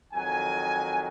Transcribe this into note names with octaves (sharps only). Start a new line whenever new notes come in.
F2 D#3 F#3 G#5